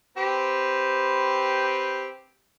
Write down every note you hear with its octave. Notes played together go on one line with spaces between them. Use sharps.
C4 G4 B4